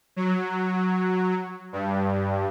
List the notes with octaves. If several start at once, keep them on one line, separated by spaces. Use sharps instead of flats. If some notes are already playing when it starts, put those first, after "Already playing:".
F#3
G2